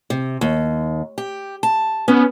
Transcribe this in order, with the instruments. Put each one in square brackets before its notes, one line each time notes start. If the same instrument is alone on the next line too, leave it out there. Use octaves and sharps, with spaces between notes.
[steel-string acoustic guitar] C3
D#2
G4
A5
[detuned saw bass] B3 [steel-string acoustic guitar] C#4